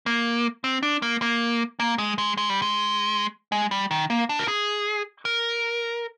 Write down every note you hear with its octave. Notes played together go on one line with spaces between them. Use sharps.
A#3
C4
D4
A#3
A#3
A#3
G#3
G#3
G#3
G3
G#3
G#3
G3
D#3
A#3
D4
A#4
G#4
A#4